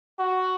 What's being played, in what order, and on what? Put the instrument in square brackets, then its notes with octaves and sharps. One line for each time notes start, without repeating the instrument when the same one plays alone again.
[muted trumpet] F#4